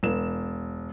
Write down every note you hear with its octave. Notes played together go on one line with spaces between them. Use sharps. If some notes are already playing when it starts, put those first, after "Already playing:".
E1 E7